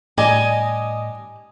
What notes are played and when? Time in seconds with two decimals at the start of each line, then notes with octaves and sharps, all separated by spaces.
0.18 A2 G3 D4 D#5 G#5